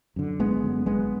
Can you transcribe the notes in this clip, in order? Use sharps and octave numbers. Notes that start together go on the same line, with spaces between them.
F#2 D3
G#1 G#3 B3
F#2 D3
G#1 G#3 B3